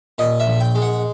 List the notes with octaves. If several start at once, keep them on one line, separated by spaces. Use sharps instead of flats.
A#2 D#5
E5
A#1
G5
G#3
F#5